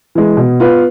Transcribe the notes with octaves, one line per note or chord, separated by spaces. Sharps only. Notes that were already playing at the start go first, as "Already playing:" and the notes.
E3 G#3
B2
B3 F4 B4